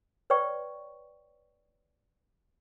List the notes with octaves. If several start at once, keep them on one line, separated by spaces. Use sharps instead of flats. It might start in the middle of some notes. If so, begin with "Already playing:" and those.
B4 C#5 D5 G5 C#6